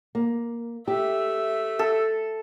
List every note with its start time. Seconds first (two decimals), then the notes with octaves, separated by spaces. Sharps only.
0.15 A#3
0.88 A3 G4 E5
1.79 A4